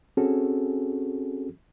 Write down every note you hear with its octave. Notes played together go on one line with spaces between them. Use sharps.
C4 C#4 F#4 G#4 A4